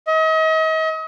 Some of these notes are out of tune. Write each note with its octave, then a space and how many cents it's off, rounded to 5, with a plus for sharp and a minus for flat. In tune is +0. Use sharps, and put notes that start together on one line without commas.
D#5 +40